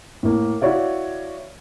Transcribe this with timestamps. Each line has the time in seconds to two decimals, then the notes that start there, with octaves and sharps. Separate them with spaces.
0.23 A2 A#3
0.61 E4 F#4 C#5 D5 F5